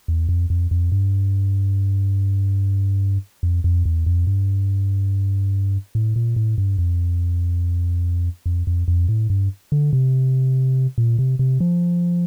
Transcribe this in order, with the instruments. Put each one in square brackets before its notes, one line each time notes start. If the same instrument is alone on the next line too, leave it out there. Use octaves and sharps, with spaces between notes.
[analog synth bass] E2
F2
F2
F2
G2
F2
F2
E2
F2
G2
A2
A#2
A2
G2
F2
F2
F2
F2
A2
G2
D3
C3
A#2
C3
C3
F3